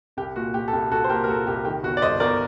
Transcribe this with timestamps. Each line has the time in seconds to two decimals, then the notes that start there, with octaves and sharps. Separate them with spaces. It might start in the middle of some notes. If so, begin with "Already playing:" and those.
0.17 C2 G4
0.36 A#2 F#4
0.54 A#2 G4
0.68 A4
0.73 C2 G4
0.91 C2 F#4 A4
1.04 C5
1.09 A#2 G4 A#4
1.24 A#4
1.28 A#2 F#4 A4
1.47 C2 G4
1.65 D#3 G4
1.83 G1 F#4
1.97 D5
2.02 G2 C5 D#5
2.20 G1 A#4 D5